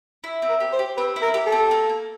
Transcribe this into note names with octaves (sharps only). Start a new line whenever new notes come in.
E4
C4
A#4
G4
C5
G4
C4 B4
E4
A#4
G4
A4
C4
A#3
A#3